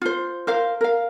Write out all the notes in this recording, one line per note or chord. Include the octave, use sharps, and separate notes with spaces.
F4 C5
A#4 C5 F5
A#4 F5